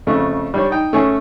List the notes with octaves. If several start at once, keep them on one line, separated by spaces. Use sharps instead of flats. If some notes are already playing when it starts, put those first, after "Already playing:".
F2 C#3 A3
G3 D4 C#5
D#4 G5
A3 C#4 G#4